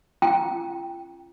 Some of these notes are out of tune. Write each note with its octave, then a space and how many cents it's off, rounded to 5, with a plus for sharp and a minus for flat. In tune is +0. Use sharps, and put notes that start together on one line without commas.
C#4 -15 F4 -40 G5 +0